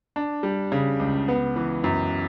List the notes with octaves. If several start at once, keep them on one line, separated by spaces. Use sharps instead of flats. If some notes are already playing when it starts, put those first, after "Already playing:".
D4
G3
C#3
C#2
B3
E3
F#2